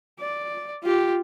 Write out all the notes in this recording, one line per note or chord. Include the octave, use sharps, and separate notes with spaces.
D5
F4 G4